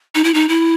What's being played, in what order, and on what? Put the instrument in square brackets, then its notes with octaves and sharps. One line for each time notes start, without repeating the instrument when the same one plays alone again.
[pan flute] D#4
E4
D#4
E4